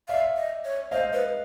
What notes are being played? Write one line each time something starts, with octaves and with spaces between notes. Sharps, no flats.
D5 E5 F5
D#5
C#5
C5 D#5 F5
B4